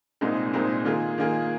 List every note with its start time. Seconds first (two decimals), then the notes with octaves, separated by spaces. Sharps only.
0.21 C2 A#2 G#3 C4 D#4
0.53 C2 A#2 G#3 C4 D#4
0.85 D#3 A#3 F4 G#4
1.18 D#3 A#3 F4 G#4